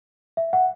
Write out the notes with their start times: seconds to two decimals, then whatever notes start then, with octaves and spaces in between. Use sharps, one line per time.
0.37 E5
0.53 F#5